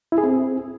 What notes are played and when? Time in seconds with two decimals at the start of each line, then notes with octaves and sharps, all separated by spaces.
0.12 E4
0.18 G#4
0.23 C4